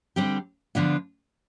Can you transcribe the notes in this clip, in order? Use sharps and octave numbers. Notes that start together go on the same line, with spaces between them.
D3 G3 C4 G4
D3 F3 B3 D4 F4